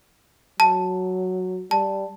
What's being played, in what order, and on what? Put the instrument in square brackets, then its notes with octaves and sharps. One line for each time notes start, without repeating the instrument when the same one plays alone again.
[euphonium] F#3 [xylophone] A5
[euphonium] G3 [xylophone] A5